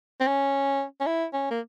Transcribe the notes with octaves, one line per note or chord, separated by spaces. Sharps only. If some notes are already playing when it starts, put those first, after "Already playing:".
C4
C#4
C#4
E4
C#4
A#3